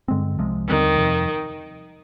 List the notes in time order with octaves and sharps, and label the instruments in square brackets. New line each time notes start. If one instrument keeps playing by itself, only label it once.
[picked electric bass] G2 D3 G#3 C4
C2 C3 F3 G#3
[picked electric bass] D#2 D3 G3 C4 [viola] D#3
[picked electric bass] F2 C3 F3